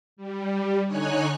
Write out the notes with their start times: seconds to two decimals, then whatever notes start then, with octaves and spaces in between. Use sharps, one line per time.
0.16 G3
0.85 D3 D#4 C#5 G#5 F#6